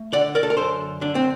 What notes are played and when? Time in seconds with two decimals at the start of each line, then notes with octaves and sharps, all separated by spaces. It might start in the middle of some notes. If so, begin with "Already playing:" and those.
Already playing: A3
0.13 D3 D5 F#5
0.35 A#4 D5
0.43 A4
0.50 A#4
0.57 F#2 A4 C5
1.01 D3 D4
1.15 C4